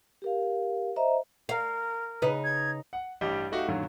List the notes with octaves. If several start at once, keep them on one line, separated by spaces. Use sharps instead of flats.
G4 A#4 F5
C5 D#5 E5 A#5
A#4 F5
C#3 D#4 B4
G#6
F#5
A1 G2 G3 G4 D#5
A3 D#4 F#4 G4 F5
F#2 A#2 D3 D#3 F#3